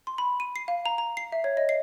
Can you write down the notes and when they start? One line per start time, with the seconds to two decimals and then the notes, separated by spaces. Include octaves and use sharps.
0.07 C6
0.18 B5
0.40 D#7
0.56 C7
0.68 F5
0.86 A#5
0.98 A#5
1.17 C7
1.32 E5
1.44 C#5
1.57 D#5
1.69 C7